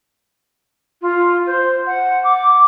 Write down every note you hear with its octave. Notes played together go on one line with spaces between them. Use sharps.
F4
C5
F#5
D6